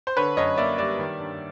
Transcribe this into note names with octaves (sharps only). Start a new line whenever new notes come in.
C5
D3 B4 C#5
F#2 C#5 D#5
A#3 D5 E5
G3 D5 E5
D#3
G2